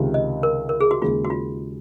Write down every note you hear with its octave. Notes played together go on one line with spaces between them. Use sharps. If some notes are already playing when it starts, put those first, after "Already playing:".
Already playing: C#2 C3 D#3
D#5
A#4
A#4
G#4
F#4
D#2 C#3 G#3 F4
F#4
F4